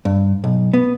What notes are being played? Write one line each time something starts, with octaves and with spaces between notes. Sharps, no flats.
G2
B1
B3